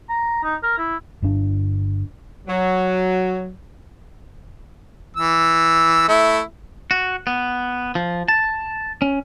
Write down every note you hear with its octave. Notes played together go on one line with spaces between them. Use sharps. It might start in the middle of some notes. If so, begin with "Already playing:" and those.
A#5
D#4
A#4
E4
G1 G2 D4
F#3
E3 E6
A3 E4
F#4
B3
F3
A5
C#4